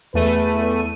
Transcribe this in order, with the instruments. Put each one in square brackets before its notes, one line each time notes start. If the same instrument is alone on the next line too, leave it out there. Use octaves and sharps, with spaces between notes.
[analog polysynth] E2 A3 D#7 [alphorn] B4